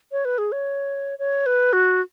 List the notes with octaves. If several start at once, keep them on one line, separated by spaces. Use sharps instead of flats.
C#5
B4
G#4
C#5
C#5
B4
F#4